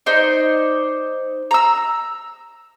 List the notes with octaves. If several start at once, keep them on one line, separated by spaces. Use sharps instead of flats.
D#4 C5 D5
A#5 E6